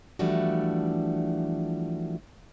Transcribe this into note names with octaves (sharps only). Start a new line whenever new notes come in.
E3 F3 G3 A3 D4 F#4